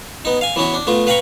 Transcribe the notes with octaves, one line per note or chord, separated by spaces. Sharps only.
B3 D#4
F5 G#5
E3 B3 C#4 E4 F#4
D4
A3 B3 F4
B4 F5 G5 A#5 B5 C#6